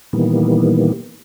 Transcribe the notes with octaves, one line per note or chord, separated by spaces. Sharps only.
A#2 D#3 E3 G3 A#3 B3